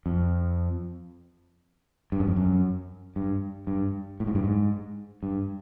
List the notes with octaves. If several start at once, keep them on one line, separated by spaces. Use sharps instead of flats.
F2
G2
F#2
F2
F#2
G2
G2
A2
G#2
G2
G#2
G2